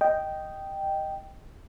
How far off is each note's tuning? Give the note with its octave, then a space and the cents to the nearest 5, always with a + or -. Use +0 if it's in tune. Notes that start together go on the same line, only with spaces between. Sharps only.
D#5 +0 G5 -5